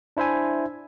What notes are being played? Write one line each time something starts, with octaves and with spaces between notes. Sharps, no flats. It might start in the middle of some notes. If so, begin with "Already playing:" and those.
D4 E4 C5 E5 G#5